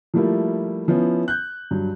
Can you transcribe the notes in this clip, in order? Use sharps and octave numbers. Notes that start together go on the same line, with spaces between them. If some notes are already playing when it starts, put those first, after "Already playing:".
F3 G3 A3 A#3 E4 F4
F3 B3 C#4 E4
F#6 G6
G2 F#3